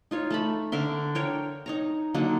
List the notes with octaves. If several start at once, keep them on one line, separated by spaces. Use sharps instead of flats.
D#4 F4 C#5
A3 A5 B5
D3 A#4 E5 C6
A#4 C#5 G5
D#4 C#5 A#5
D3 F#3 A#3 D#4